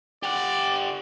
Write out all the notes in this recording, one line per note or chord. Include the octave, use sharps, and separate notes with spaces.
G4 D5 F#5